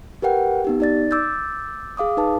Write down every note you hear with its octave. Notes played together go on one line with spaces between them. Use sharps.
G4 A#4 B4 F#5 G5
B3 D#4 G4
D#4 D5 A6
D6 E6 G6 A6
G#4 F5 D6 D#6
D#4 B4 A5